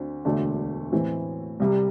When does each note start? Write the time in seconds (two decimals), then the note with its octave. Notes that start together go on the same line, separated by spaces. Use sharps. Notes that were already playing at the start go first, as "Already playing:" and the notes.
Already playing: D2 D3 C4
0.25 E1 D2 D3 A3 D4
0.92 A2 E3 C4
1.60 C2 C3 G3